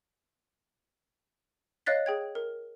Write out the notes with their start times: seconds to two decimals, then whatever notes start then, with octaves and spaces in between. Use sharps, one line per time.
1.86 C#5 D#5 F5 F#6 A6 B6
2.06 G#4 G5 G#6
2.35 A#4